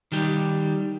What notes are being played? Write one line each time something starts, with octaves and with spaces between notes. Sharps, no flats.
D#3 G3 G4